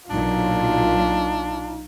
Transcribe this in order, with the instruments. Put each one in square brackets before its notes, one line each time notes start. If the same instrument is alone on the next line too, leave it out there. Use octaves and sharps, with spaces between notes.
[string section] B1 A#2 F#3 [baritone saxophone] D4 [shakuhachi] D#4 [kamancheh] F4